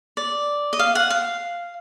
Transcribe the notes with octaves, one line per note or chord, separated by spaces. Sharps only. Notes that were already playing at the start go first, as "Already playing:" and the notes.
D5
D#5
F5
F#5
F5